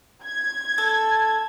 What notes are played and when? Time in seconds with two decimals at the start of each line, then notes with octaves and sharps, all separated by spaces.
0.25 G#6
0.78 A4